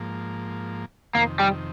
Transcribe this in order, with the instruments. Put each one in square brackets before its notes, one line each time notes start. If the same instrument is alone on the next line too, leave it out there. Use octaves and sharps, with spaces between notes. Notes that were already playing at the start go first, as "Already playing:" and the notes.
Already playing: [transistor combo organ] G#2 F3 A#3
[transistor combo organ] F2 C3 D#3 [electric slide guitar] A#3
[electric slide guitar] G3